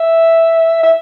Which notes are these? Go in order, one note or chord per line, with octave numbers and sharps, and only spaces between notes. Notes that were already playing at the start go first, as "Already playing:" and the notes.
Already playing: E5
E5